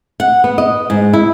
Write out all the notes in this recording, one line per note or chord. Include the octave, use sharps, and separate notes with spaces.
F#5
B3
D#5
G#2
E4